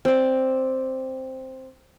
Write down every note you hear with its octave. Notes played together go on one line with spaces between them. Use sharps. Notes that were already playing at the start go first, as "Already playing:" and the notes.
C4 D5